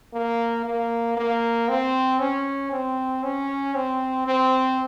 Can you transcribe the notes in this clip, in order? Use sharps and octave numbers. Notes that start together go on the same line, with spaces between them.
A#3
A#3
A#3
C4
C#4
C4
C#4
C4
C4